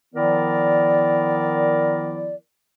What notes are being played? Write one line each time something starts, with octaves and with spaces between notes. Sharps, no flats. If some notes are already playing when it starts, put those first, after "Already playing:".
D#3 F3 B3 E4 A#4 D5